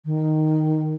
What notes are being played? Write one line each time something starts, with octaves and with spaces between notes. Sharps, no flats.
D#3